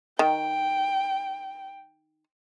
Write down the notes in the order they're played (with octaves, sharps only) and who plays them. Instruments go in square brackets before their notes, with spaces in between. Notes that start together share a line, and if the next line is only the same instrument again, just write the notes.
[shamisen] D#3 [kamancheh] G5